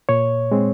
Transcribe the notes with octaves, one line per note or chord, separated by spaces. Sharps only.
A#2 C#5
G#3 C4